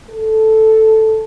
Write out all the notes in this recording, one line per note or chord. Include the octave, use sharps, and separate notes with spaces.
A4